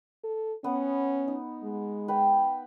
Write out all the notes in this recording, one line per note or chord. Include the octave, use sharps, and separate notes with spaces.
A4
B3 C#4 D#6
D#4
G#3
B4 G5